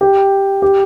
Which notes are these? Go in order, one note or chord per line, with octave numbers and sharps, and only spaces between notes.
G4
G4